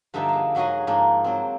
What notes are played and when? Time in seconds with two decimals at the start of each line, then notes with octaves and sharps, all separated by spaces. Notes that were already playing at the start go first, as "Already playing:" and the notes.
0.14 G2 D3 F3 D#4 E5
0.29 A#3 G#4
0.55 G#2 F#3 F#4 G#4 D#5
0.87 G#2 F3 A#3 D4
1.24 F#3 C4